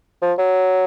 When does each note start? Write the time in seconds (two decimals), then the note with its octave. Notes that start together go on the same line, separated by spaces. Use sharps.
0.22 F3
0.38 F#3